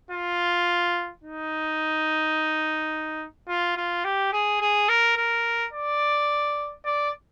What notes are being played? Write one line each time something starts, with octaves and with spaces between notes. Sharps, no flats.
F4
D#4
F4
F4
G4
G#4
G#4
A#4
A#4
D5
D5